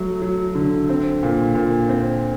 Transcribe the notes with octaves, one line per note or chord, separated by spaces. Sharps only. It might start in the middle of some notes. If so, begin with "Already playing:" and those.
Already playing: F#3 A3
F#3
D3
C4
A#2
A#2
C4